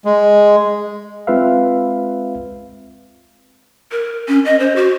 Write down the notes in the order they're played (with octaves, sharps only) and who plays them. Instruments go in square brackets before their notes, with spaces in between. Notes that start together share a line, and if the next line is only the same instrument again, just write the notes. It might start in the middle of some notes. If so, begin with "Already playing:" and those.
[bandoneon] G#3
[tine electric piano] G#3 C4 F4 B4 E5 F5
[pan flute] A#4
C#4
D#5
C5
F#4